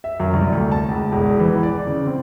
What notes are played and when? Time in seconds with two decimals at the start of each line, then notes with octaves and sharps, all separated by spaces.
0.04 E5
0.20 F#2
0.33 C2
0.52 D2
0.72 A5
0.88 C#2
1.12 E1
1.40 E3
1.63 D5
1.87 C#3
2.06 C4